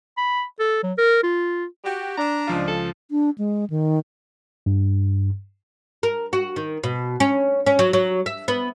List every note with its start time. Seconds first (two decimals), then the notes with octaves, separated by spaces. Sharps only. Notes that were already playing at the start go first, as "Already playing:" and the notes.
0.17 B5
0.59 A4
0.83 F#3
0.98 A#4
1.23 F4
1.84 F#4 G4
2.17 D4 A#5
2.47 C#2 F3 F4
2.68 A4
3.11 D4
3.38 G#3
3.70 D#3
4.66 G2
6.03 A#4
6.33 F#4
6.56 D#3
6.84 B2
7.20 C#4
7.66 C#4
7.79 F#3
7.93 F#3
8.26 E5
8.48 B3